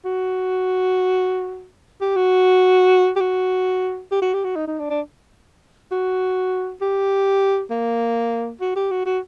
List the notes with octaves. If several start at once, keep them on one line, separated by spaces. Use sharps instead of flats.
F#4
G4
F#4
G4
F#4
G4
F#4
G4
F#4
D#4
D#4
D4
D4
F#4
G4
A#3
F#4
G4
F#4
F#4